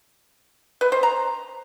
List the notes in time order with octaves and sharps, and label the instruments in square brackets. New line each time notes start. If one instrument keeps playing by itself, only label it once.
[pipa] B4
C5
A#5